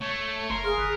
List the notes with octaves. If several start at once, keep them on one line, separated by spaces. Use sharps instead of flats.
A3 C#5
F#1 A#4 C6
G#4 F5
G1 B4